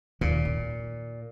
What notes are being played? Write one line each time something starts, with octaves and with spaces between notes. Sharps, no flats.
D#2 A#2
A#3